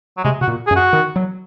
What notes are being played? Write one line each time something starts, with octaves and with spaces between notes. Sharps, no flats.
F#3
C3 G#3
C3 F#4
A#2
F#2 G#4
F#4
D#3
F#3